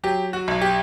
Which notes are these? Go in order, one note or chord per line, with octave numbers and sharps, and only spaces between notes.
F#3 G4
F#4
B1
G4